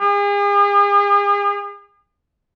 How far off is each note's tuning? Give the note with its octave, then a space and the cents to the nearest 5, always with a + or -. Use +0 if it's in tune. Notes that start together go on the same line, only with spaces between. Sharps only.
G#4 -40